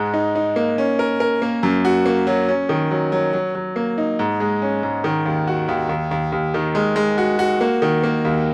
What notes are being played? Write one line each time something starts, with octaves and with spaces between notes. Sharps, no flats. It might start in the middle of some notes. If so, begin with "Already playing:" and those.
Already playing: G#2 G#3
D#4
D#4
A#3
C#4
A#4
A#4
A#3
F#2
F#4
A#3
F#3
C#4
D#3
F#3
F#3
F#3
F#3
A#3
D#4
G#2
G#3
C#4
G#2
D#3
D#2
F#4
D#2
D#2
D#2
D#2
D#3
G#3
G#3
F#4
F#4
A#3
D#3
A#3
D#2